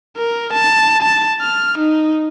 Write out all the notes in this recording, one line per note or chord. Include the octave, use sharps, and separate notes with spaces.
A#4
A5
A5
F6
D#4